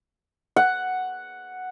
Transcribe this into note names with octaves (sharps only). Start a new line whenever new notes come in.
F#5